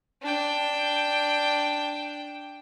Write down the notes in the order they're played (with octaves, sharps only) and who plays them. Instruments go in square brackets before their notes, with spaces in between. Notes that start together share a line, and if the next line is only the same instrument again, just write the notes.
[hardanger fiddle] D4 G5